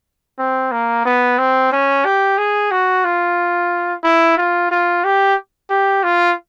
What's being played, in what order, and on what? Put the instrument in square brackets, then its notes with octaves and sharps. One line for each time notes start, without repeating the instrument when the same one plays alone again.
[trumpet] C4
A#3
B3
C4
C#4
G4
G#4
F#4
F4
E4
F4
F4
G4
G4
F4